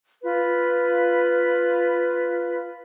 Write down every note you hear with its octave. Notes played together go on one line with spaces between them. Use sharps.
F4 B4